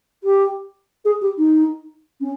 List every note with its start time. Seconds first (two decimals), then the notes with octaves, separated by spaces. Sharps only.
0.23 G4
1.04 G#4
1.21 G4
1.38 D#4
2.20 C#4